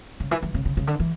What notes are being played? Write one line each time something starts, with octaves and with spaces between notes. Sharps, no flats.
C#3
E3
E3
C#3
C#3
C#3
D3
E3